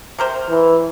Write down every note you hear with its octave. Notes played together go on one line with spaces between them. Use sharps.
C3 A#4 C5
E3